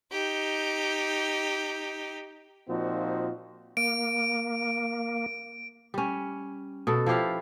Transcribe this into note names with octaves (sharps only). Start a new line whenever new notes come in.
D#4 G4
A#2 F3 C4 D#4 F#4
A#3 D7
G3 C#4
B2 A4
F3 E4 G4 F5